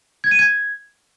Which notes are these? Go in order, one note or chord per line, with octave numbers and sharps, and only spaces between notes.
G#6
D#7
G#6